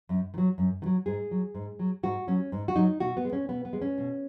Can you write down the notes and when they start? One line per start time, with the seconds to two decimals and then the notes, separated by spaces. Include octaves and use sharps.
0.09 F#2
0.34 D#3
0.38 F#3
0.58 F#2
0.82 D#3
0.86 F#3
1.06 G#2 G#4
1.31 F#3
1.55 G#2
1.79 F#3
2.03 G#2 F#4
2.28 F#3 C#4
2.52 G#2
2.68 F#4
2.76 F#3 D#4
3.00 B2 F#4
3.17 B3
3.25 G#3
3.33 C#4
3.49 B2 B3
3.65 B3
3.73 G#3
3.82 C#4
3.98 B2